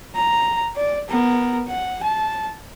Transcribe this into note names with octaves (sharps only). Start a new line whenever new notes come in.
A#5
D5
B3 A#4
F#5
A5